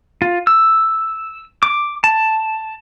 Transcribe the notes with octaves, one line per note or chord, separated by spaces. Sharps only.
F4
E6
D6
A5